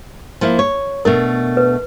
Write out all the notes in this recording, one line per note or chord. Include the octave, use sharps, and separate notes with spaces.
F3 A#3 E4
C#5
B2 A3 D4 A#4
B4